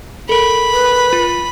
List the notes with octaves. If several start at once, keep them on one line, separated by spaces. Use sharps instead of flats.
A4 A#4 B5
B4
F4